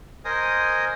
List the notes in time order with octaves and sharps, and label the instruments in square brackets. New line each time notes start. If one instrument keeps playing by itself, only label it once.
[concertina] A#4 C5 D#5 G#5 D#6